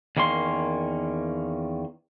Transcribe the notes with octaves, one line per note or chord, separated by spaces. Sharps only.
E2 D#3 A#3 C#4 C6